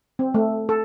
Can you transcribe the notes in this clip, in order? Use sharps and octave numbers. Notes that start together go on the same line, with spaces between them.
C4
A3
A4